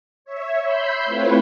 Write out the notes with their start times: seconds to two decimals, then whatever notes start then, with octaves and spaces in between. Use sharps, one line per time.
0.25 C#5 E5
0.64 B5 C6 E6 G6
1.05 A3 C4 E4 F4 B4 C#5